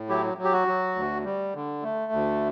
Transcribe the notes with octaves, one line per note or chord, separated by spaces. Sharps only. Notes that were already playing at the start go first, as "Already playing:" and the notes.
Already playing: A2
F#3 E4 G4
F#3
G4
F#4
F#3
D2
G3
D3
A3
D2